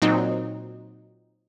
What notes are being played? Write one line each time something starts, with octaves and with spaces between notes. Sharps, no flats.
A#2 F#3 C4 D#4